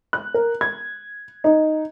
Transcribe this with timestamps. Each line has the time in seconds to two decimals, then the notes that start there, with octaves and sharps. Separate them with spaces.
0.13 F#6
0.34 A#4
0.61 G#6
1.44 D#4